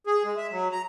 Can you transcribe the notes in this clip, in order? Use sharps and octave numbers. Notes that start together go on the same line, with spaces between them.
G#4
G#3
E5
F#3
A#5